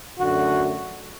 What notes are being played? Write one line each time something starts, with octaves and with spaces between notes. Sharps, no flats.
F#2 D3 A3 F#4